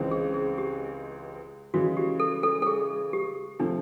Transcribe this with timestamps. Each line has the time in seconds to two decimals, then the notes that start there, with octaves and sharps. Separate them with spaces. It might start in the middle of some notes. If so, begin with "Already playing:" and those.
Already playing: C#2 C#3 E3 G#3 C4
0.11 G#4
0.34 G#4
0.58 G4
1.74 C#3 E3 G#3 F#4
1.97 G4
2.20 A4
2.43 A4
2.62 A4
2.67 G#4
3.13 G4
3.59 C3 F3 A3 D4